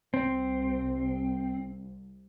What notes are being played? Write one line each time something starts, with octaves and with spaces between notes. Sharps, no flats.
C2 C4